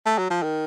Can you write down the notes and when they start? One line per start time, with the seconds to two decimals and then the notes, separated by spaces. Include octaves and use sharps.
0.06 A3
0.18 F#3
0.30 F3
0.43 D#3